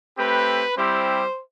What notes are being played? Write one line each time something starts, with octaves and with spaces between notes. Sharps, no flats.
A3 C4 G4 B4
G3 C4 E4 G4 C5